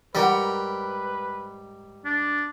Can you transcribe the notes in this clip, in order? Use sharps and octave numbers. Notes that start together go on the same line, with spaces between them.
G#2 G3 A#4 B4 F#5
D4